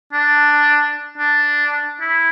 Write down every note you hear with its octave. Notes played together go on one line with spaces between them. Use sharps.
D4
D4
E4